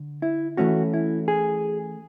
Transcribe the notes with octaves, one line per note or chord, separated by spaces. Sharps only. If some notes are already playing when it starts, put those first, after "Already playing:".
Already playing: D3
E4
E3 A3 C#4 F#4
E4
G#4